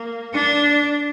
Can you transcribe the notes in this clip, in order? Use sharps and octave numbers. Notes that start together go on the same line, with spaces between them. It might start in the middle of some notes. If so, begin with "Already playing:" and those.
Already playing: A#3
D4